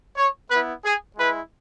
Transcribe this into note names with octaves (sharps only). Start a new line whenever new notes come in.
C#5
B3 E4 B4
G#4
G#3 E4 B4